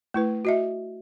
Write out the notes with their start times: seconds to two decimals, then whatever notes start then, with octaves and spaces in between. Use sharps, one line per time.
0.14 A3 E4 B4
0.45 F#4 D#5 E5